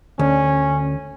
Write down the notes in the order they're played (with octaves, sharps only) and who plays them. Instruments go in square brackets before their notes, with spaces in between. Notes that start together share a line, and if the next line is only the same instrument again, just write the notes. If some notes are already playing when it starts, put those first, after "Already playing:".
[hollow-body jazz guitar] D2 [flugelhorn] C#4